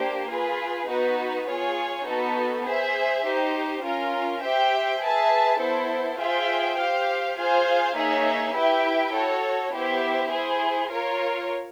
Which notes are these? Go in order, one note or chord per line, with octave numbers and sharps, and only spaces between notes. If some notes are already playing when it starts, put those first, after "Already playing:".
Already playing: A#3 D4 G4 C5
F4 G#4 B4
B3 D#4 F#4 B4
F4 G#4 C#5
B3 D#4 F#4 A4
G#4 C5 E5
D#4 G4 C5
C#4 F4 A#4
G4 C5 E5 G5
G#4 B4 E5 A5
B3 E4 A4 C5
F4 G#4 C5 E5 G5
G4 C5 F5
F4 G#4 C5 F5 G#5
A#3 D#4 G#4 C#5 E5
E4 G4 B4 E5 G5
F#4 A4 C#5
B3 E4 G4 C5 E5
E4 G#4 C5
F4 A#4 C#5